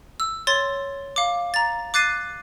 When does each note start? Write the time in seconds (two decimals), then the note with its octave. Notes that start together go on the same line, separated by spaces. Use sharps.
0.20 E6
0.47 C#5 C6 A6
1.16 F5 D6
1.54 A#5 A6
1.94 D6 F#6 A6 C7 D#7